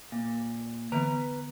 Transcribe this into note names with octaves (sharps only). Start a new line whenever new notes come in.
A#2
D3 E3 B3 B4 A#5